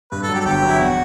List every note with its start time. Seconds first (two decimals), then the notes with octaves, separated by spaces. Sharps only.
0.12 G2 B4
0.23 A4
0.29 F#3
0.35 G4
0.40 A4
0.45 G1 G4
0.62 F#3
0.68 E4
0.79 E2 F#4